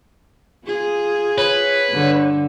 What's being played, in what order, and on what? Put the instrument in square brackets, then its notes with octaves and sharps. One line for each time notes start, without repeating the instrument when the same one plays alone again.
[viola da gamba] F4 G#4
[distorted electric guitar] B4 [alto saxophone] C#5
[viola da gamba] G2 D3